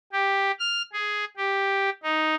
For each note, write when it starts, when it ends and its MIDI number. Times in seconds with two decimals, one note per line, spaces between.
0.12 0.51 67
0.59 0.82 89
0.93 1.25 68
1.37 1.90 67
2.03 2.35 63